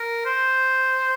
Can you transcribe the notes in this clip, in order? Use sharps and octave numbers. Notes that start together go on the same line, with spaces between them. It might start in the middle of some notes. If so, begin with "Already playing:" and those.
Already playing: A#4
C5